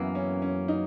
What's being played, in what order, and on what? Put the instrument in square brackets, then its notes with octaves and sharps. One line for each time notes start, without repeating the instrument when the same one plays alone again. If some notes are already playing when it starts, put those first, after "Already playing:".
Already playing: [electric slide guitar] F#2 E3 A#3 [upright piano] B3
[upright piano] C#4
C#4
D#4